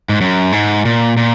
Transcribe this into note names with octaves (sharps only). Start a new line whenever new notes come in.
G#2
F#2
G#2
A#2
A#2